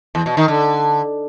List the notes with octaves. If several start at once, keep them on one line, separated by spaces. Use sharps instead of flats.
E2
B2
D#3
D3